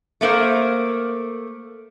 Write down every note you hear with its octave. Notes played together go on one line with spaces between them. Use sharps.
A3 A#3 A#4 C5